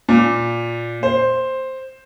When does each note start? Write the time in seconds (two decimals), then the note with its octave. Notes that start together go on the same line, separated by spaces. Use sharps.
0.09 A#2
1.03 C5